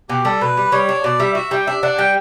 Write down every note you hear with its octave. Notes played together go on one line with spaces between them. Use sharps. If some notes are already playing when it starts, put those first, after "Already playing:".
B2 G4
G3 A4
B2 B4
G3
G3 C#5
D4
B2 D5
G3 E5
F#4 E5
G3 G5
D4 E5
D4 F#5
G3 G5